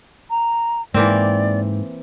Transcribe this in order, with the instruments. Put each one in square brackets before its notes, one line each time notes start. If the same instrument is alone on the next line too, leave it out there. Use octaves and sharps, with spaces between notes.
[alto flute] A#5
[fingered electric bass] G#2 [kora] E3 A#3 C4 [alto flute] D5